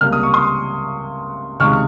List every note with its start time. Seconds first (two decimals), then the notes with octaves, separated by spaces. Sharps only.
0.01 C#2 C3 G3 A#3 F6
0.12 D#6
0.23 C#6
0.34 C6 D#6
1.60 C#2 C3 D#3 G#3 C#6 F6